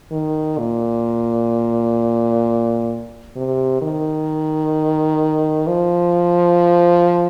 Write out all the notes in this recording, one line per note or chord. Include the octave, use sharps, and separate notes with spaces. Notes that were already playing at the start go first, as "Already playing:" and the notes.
D#3
A#2
C3
D#3
F3